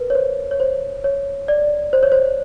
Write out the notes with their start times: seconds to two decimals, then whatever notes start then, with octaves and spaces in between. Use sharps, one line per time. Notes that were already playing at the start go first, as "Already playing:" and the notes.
Already playing: A#4 B4
0.10 C#5
0.15 C5
0.51 C#5
0.60 C5
1.04 C#5
1.48 D5
1.93 C5
2.03 C#5
2.12 C5